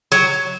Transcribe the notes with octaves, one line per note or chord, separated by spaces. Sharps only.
F#3